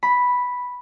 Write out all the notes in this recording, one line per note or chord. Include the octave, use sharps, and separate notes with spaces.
B5